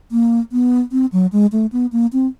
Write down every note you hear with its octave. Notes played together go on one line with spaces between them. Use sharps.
A#3
B3
C4
F#3
G#3
A3
B3
A#3
C4